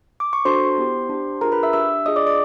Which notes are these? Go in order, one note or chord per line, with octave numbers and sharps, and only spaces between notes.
D6
C#6
D4 F#4 A4 C5 C6
B3 E4 G4
D4 G4
D4 F4 G#4 A#4 A#5
B4 B5
E5 E6
D4 G4 E5 E6
D4 F4 G#4 D#5 D#6
D5 D6
D5 D6